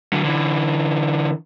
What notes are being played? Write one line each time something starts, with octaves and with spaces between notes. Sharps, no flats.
D3 F#3
D3 E3